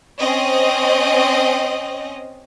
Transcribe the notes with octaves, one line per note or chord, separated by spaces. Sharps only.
C4 C#4 D#5